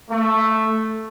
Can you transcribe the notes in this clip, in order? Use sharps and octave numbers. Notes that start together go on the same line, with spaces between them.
A3